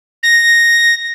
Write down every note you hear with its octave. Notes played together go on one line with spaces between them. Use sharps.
A#6